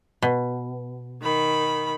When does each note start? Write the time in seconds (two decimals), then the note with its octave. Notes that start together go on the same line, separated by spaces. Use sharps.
0.22 B2
1.22 D#3 B5